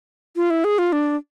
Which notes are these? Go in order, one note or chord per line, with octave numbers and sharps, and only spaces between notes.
F4
E4
G#4
F4
D4